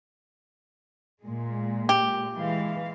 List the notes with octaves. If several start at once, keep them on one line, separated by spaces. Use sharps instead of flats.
A#2 G#3
G4
E3 G#3 F5